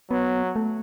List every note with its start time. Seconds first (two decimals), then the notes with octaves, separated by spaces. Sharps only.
0.11 F#3 B3
0.56 A3